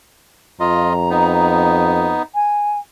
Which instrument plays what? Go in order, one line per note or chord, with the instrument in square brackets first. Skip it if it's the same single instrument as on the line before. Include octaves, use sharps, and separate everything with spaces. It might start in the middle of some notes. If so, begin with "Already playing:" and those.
[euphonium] F2 [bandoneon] F4 D#5 [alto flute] A#5
[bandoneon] B3 D#4
[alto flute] G#5